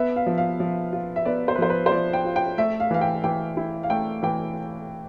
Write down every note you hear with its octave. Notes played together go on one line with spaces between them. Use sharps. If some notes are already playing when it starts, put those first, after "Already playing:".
Already playing: B3 E5
F5
F3
F5
F3
F4
E5
B3 D5
C5
B4
F3 C5
B4
C5
F3 D5
G5
F4
G5
A3 E5
F5
E3 F5
G5
E3 G5
E4
F5
A3 G5
E3 G5